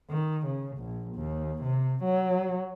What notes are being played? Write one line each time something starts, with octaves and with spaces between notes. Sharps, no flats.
D#3
C#3
A#1
D#2
C3
F#3